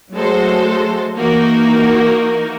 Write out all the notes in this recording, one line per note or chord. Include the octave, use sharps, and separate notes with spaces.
F#3 G#3 A3 F#4 A4 C5
E3 A#3 D#4 F#4 A#4